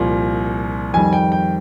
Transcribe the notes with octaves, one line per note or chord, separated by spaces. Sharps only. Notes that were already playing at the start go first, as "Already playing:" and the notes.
Already playing: C2 A#2 F3
F2 D#3 G3 G#5
G5
G5